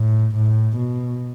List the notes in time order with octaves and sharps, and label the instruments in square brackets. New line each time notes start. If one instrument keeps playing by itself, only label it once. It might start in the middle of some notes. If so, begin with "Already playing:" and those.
Already playing: [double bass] A2
A2
B2